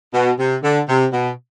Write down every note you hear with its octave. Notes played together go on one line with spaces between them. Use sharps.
B2
C3
D3
C3
B2